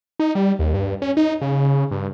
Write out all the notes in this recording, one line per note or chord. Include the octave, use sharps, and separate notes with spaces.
D#4
G3
D#2
G2
C#4
D#4
C#3
G2